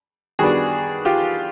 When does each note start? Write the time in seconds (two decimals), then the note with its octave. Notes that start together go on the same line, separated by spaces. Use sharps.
0.39 D#3 G3 B3 D4 F#4 G#4
1.05 F4 G4